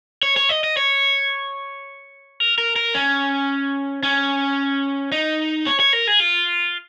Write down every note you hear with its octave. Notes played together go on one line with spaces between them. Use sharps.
C#5
C#5
D#5
D#5
C#5
A#4
A#4
A#4
C#4
C#4
D#4
C#5
C#5
A#4
G#4
F4